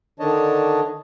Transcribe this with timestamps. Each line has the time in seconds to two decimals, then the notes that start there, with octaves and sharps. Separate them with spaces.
0.20 D3 D#3 D4 C#5 D#5 A5